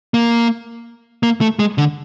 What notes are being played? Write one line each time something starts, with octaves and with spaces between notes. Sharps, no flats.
A#3
A#3
A3
G#3
D3